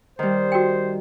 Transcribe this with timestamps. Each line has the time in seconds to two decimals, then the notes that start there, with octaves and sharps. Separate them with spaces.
0.19 D#3 G3 C5
0.52 F#4 G5